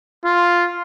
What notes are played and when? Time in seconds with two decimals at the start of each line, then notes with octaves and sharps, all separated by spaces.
0.25 F4